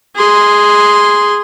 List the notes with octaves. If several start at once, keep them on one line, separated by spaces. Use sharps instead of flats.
G#4 C6